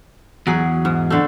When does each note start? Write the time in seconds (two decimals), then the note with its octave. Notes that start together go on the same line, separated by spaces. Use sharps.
0.47 E2 F#3 G#4
0.85 G#2
1.10 D3 A3